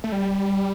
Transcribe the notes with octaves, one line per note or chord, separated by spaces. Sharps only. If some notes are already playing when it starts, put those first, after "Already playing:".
A3
G3